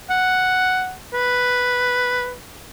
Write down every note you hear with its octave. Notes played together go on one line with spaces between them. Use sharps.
F#5
B4